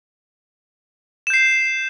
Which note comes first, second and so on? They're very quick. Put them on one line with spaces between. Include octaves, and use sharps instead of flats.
E7 G6 C7